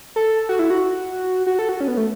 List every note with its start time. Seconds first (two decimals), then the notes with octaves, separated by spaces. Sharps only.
0.16 A4
0.49 F#4
0.59 E4
0.70 F#4
1.47 F#4
1.59 A4
1.69 F#4
1.81 C#4
1.88 B3
1.97 A3